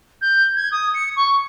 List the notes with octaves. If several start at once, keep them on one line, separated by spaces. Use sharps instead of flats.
G6
G#6
D#6
C#7
C#6